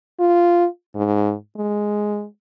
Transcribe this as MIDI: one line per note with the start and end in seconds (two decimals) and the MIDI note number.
0.20 0.66 65
0.95 1.33 44
1.57 2.25 56